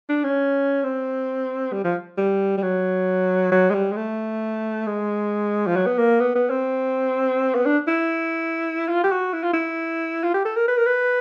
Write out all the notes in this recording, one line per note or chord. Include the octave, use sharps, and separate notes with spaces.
D4
C#4
C4
G3
F3
G3
G3
F#3
F#3
G#3
G3
G#3
A3
G#3
F3
F#3
B3
A#3
B3
B3
C4
B3
D4
E4
F4
G4
F#4
E4
F4
E4
F4
G4
A4
A#4
B4
A#4
B4